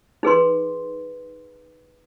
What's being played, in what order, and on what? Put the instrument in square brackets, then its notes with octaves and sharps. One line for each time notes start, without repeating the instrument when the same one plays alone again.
[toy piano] D#4 G#4 B4 C6